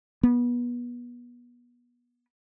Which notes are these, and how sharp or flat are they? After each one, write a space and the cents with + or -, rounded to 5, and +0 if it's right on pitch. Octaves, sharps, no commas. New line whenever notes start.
B3 -30